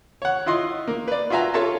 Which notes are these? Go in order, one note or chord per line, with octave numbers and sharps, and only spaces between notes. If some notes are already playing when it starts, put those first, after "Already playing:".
C#5 F#5
E4 F4 D#5 C6
A#3
B4 D5
F4 F#4 E5 G#5 A#5
F4 A4 C#5 E5 A5 A#5